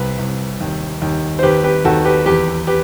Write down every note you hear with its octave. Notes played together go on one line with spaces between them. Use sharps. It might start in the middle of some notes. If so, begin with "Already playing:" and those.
Already playing: C2 B4
C2
D#2
D#2
C5
D#2 G4 B4
G4 B4
D#2 F#4 A4
G4 B4
E2 G4 B4
G4 B4